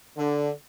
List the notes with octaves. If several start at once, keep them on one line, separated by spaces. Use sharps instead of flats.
D3